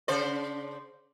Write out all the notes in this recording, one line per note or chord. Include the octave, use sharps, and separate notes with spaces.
C#3 C5 D5